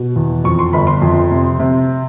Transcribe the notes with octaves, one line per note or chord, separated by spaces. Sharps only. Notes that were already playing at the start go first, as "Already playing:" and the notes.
Already playing: B2
E2
F2 C#6
C6
G1 B5
C6
F2
C3
C3